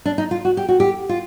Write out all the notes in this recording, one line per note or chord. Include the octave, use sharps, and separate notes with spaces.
D4
D#4
F4
F#4
G4
F#4
G4
F4